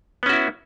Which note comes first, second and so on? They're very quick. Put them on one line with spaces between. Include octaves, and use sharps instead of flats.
B3 C#4 F#4 E4